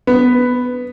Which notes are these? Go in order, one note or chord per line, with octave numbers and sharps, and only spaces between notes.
B3